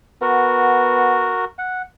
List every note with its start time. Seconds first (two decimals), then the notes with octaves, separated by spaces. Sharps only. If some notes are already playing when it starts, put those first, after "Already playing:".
0.22 B3 F#4 A#4
1.58 F#5